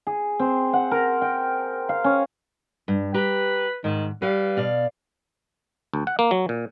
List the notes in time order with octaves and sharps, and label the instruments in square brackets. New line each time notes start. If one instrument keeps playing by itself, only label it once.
[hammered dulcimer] G#4
C4
F#5
A#4
G5
F5
C#4
[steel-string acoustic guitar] G2
[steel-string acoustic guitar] G4 A#5 [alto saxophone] B4
[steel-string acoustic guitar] G#2 [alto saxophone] D#3
[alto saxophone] G3 [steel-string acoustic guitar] B4 F5
[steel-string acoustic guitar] B2 D5 F5
[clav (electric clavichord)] D2
F#5
A#3
F#3
A#2